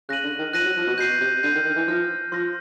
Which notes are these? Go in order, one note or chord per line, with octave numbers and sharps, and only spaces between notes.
C#3 F#6 A#6 D#7 F#7
D3
D#3
F3 F#6 A#6 D#7 F#7
F#3
F3
B2
B2 G6 C7 D#7
C3
D3 G6 C7 D#7
D#3
D#3
E3
F3 C6 F6 A#6
F3 C6 F6 A#6